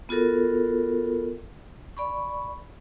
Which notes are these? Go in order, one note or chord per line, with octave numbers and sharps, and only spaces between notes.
B3 F4 F#4 A4 A#4
D5 B5 C#6